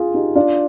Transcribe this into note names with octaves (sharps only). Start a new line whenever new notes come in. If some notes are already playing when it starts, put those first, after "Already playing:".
Already playing: F4 G#4
D#4 G4
D4 F4